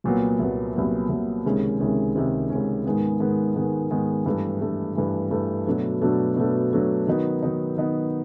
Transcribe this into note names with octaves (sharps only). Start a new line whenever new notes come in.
C2 A#2 F#3 B3
C2 A#2 F#3 B3
C2 A#2 F#3 B3
C2 A#2 F#3 B3
C#2 C3 D#3 G#3 C#4
C#2 C3 D#3 G#3 C#4
C#2 C3 D#3 G#3 C#4
C#2 C3 D#3 G#3 C#4
G#2 D#3 G#3 B3
G#2 D#3 G#3 B3
G#2 D#3 G#3 B3
G#2 D#3 G#3 B3
G2 E3 A3
G2 E3 A3
G2 E3 A3
G2 E3 A3
B2 F#3 A3 D4
B2 F#3 A3 D4
B2 F#3 A3 D4
B2 F#3 A3 D4
D#3 F#3 B3 D#4
D#3 F#3 B3 D#4
D#3 F#3 B3 D#4